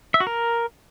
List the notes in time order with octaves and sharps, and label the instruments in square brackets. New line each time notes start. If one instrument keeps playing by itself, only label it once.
[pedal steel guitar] E5
F#4
A#4